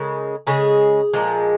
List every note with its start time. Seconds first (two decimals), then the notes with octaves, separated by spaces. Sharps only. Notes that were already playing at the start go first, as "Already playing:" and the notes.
Already playing: C#3 G#3 A#4
0.47 C#3 G#3 G#4
1.14 A#2 F3 G#3